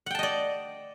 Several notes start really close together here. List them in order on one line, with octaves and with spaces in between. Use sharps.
F#5 G5 A5 D#5 D5